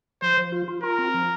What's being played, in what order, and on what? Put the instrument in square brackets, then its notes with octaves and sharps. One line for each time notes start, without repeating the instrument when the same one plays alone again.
[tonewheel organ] F3 [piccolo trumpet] C5
[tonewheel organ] F3
F4
F4
[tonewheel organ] F4 [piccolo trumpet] A#4
[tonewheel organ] C4
F3